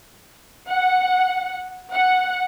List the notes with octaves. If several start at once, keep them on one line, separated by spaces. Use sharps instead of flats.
F#5
F#5